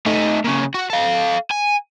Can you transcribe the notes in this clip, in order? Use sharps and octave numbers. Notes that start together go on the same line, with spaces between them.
A3 D#4
A#2 C#3
F#4
A4 F5
G#5